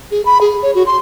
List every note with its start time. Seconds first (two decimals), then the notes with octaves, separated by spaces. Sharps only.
0.11 G#4
0.25 B5
0.41 G#4
0.63 C#5
0.75 F#4
0.86 C6